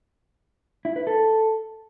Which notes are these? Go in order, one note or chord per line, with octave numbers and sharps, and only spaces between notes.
E4
B4
A4